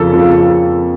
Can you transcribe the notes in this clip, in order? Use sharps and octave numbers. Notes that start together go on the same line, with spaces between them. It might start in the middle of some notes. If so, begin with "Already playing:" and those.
Already playing: F2 C#3 F3 A#3 A4
F2 C#3 F3 A#3